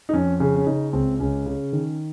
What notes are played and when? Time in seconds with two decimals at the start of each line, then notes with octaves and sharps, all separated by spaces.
0.09 D#4
0.13 F2 C#4
0.40 C#3 C#4
0.56 C#4
0.66 C#3 D#4
0.93 C#2 C4
1.19 C#2 C#4
1.46 C#3
1.73 D#3